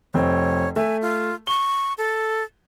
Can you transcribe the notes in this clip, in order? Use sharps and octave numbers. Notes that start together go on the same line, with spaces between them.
F1 C4 C#5
A3 E5 G#5
F4
C#6 G7
A4